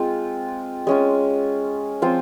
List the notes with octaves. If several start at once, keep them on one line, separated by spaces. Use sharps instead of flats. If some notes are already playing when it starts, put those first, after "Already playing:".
Already playing: G#3 C4 F4
G#3 C#4 F4
F3 C4 F4 C5